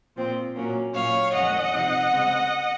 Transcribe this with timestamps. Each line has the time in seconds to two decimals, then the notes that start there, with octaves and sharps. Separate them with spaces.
0.17 A#2 F3 C4
0.56 A#2 F#3 A#3 C#4
0.94 A#2 F#3 C#4 C#5 F5
1.33 F2 D#3 G#3 C#4 D#5 F#5
1.73 C3 F3 C4 D#4
2.11 C#3 G#3 C4